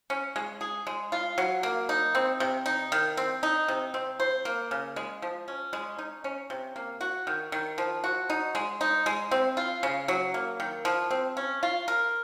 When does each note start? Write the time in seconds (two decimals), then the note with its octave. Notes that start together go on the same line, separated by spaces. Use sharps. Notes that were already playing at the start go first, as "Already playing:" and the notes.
0.10 C#4
0.36 G#3
0.61 G#4
0.87 G#3
1.12 F4
1.38 F#3
1.63 A#3
1.89 D#4
2.15 C4
2.40 C3
2.66 D#4
2.92 D#3
3.17 C4
3.43 D#4
3.68 C3
3.94 C4
4.20 C5
4.45 A#3
4.71 C#3
4.96 G#3
5.22 F3
5.48 C#4
5.73 G#3
5.98 D#4
6.24 C#4
6.50 C3
6.76 A#3
7.01 F#4
7.27 D#3
7.52 D#3
7.78 F3
8.04 F#4
8.30 D#4
8.55 G#3
8.81 D#4
9.06 G#3
9.31 C4
9.57 F4
9.83 C#3
10.08 F#3
10.34 A#3
10.60 D#3
10.85 F3
11.11 C4
11.37 C#4
11.63 F4
11.88 A#4